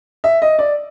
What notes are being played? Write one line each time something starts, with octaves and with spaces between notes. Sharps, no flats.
E5
D#5
D5